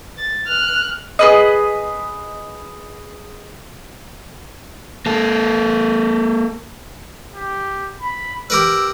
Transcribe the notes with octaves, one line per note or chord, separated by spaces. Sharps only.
A6
F6 F#6
G#4 B4 D#5
A#3 A4
G4
B5
G4 A#4 B4 E6